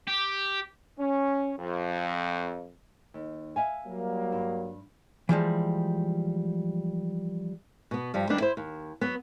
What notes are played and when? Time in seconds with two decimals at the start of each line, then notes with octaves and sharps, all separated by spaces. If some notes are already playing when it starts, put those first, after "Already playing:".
0.07 G4
0.99 C#4
1.59 F2
3.14 D#2
3.56 E5 F5 G#5
3.86 F#3 G3 A#3
4.32 G2
5.29 E3 F3 G3 G#3
7.91 B2 B3
8.14 G2 F3 G3
8.29 D#2 G3 B3 D4 D#4
8.40 E4 C5
8.57 D#2
9.01 F#3 B3